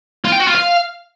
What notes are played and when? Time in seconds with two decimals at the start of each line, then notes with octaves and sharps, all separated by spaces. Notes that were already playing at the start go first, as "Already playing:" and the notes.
0.25 F4
0.32 G5
0.40 F#4
0.47 F4
0.55 F5